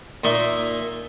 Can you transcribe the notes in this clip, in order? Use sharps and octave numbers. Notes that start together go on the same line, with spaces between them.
A#2 D#4 E5 C#6